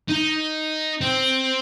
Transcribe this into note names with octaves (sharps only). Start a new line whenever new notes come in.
D#4
C4